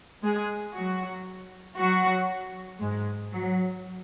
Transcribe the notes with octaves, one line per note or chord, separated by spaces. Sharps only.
G#3 G#4
F#3 F#4
F#3 F#4
G#2 G#3
F#3